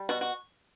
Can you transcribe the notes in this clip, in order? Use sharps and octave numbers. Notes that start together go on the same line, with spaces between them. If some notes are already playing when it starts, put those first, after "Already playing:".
Already playing: G3
B2 F#4
F#4